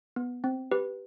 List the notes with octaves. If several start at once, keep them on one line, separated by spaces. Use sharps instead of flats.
B3
C4
G4 B4